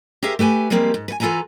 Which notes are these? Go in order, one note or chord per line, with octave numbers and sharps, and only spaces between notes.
G4 G#4 A#4 C5 E5 F5
A3 G4 B4 G#5
F3 G3 G#3 A#3 C4 G4
G#2
B4 G#5
E3 F4 A4 B4 G#5 A#5